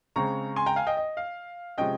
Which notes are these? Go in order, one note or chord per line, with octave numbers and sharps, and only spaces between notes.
C#3 G#3 C4 A#5 C#6
G#5 C6
G5 A#5
F5 G#5
D#5 G5
D#5
F5
C3 F3 G#3 C#4 D#5 G5